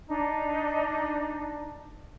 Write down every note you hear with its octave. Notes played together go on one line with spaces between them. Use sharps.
D4 D#4